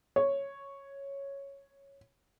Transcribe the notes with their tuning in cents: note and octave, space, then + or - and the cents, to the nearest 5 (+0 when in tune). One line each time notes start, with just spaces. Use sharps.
C#5 -5